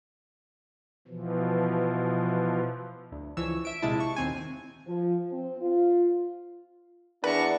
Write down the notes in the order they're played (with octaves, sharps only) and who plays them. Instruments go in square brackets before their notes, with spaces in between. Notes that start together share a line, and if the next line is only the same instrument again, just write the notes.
[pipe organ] B2 E3 F3
[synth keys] D2
C#2 E3 F3 C#5 E6
E5 D7
A#1 C3 F3 G#3 E4 A5
C#6
D#2 C4 G#5
[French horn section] F3
C4
F4
[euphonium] E2 [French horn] D4 [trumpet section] A4 A#5 C#6 [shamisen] B4